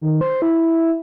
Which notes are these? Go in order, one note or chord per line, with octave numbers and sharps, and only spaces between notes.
D#3
C5
E4